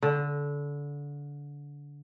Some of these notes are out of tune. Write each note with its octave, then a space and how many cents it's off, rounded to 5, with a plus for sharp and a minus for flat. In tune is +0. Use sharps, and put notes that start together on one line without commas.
D3 -25